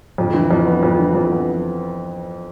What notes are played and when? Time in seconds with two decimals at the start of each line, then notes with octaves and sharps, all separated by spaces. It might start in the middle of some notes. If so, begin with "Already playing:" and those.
0.18 F2
0.34 E3
0.51 F2
0.67 B3
0.83 F2
0.99 E3
1.15 F2
1.32 B3